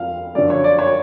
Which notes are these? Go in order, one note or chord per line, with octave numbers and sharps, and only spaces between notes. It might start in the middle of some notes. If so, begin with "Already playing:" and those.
Already playing: F2 F3 F5
F#2 D3 F3 D5
C#5
D5
C#5